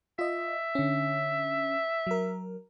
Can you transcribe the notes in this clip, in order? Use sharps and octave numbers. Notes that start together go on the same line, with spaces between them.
F4 D#5 E5
D3 C#4
F#3 A#4